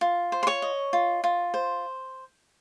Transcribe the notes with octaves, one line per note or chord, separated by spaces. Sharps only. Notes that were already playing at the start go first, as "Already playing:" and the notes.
F4
C5
C6
C#5 C#6
D#5
F4
F4
C5